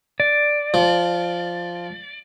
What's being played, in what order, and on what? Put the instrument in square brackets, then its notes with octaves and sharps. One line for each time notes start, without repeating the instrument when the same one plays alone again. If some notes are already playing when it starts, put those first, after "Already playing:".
[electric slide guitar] D5
[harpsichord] F3